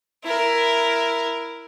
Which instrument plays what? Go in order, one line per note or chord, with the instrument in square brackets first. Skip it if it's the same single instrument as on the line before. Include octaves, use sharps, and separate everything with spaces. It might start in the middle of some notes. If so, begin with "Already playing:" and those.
[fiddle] E4 A#4